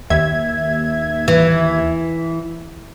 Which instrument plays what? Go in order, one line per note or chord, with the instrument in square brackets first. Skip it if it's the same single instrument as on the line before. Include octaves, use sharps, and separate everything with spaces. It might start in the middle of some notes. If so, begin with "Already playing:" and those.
[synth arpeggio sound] D#2 E5 G#6
[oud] E3